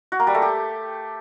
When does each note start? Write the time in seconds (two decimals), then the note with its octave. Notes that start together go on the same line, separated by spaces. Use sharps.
0.12 F#4
0.19 A#3
0.27 G3
0.34 A3
0.42 G4